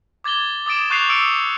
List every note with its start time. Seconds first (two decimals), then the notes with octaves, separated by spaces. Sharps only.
0.24 D6 G#6 A6 G7
0.66 D6 D#6 A6 D7 E7
0.90 C#6 F#6 G6 A6 C7 F7
1.09 D#6 E6 C#7 D7